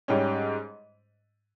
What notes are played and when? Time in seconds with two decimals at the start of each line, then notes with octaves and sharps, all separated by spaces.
0.08 G#2 G3 C#4